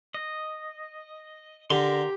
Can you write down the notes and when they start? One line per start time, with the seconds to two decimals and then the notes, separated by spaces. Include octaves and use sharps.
0.14 D#5
1.70 D3 G4 A#4 A#5 C6